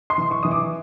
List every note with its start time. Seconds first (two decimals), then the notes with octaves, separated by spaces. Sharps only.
0.10 C6
0.18 E3
0.31 C#6
0.43 E3 D#6
0.51 D6